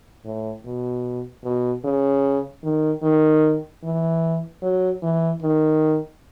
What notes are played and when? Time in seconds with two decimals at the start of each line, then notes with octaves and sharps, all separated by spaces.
0.25 A2
0.65 B2
1.44 B2
1.84 C#3
2.63 D#3
3.03 D#3
3.83 E3
4.62 F#3
5.02 E3
5.42 D#3